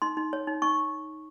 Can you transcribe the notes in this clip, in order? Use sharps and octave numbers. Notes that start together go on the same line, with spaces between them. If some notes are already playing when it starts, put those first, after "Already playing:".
D#4 C6
D#4
C#5
D#4
D#4 C#6